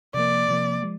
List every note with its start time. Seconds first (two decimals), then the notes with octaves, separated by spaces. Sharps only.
0.14 C3 F3 A#3 D5
0.48 C3 F3 A#3
0.82 F3 G#3